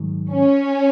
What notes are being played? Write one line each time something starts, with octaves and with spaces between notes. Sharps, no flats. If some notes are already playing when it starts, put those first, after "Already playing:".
Already playing: G#2 D#3 F#3
C#4